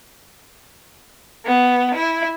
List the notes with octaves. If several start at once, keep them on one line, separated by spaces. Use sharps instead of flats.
B3
E4